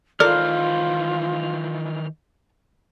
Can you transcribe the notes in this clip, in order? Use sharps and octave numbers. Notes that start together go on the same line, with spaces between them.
D#3 E3 F4 A4 A#4 C5 D5 F6